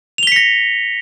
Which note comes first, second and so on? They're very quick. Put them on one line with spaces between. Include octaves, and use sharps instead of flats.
F7 G7 B6 C#7 A#6